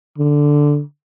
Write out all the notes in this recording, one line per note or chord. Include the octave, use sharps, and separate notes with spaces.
D3